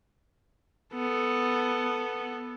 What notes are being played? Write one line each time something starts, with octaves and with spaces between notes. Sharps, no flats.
B3 A4